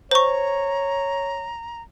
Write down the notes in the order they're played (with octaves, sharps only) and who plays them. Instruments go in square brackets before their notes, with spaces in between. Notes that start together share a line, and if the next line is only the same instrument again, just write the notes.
[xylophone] C5 C#6 [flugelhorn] C#5 [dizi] A#5